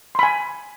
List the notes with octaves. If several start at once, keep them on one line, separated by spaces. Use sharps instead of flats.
G#5 B5 C6